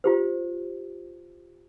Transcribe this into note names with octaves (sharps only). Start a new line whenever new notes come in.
F4 G4 C5